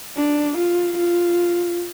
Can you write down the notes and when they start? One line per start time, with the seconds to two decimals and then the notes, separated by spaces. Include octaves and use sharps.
0.17 D4
0.58 F4
0.98 F4